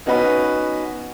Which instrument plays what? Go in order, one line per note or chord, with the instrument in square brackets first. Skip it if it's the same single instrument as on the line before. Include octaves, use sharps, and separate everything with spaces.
[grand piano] B3 C#4 D#4 F#4 B4